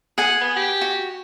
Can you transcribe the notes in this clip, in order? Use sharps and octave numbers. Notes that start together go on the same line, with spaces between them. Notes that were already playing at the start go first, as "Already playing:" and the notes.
G#4 F#5 G#5
B3
G4
F#4